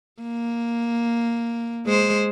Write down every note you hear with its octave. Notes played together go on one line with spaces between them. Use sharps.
A#3
G#3 C5